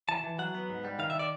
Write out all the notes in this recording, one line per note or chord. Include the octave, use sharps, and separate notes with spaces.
E3 A5
E3
F#3 F#5
B3
G#2
G3
D#3 F5
E5
D#3 D5